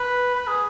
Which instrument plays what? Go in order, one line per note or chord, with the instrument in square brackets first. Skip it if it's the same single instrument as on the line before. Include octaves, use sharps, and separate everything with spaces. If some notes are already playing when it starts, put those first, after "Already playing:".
Already playing: [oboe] B4
B4
G#4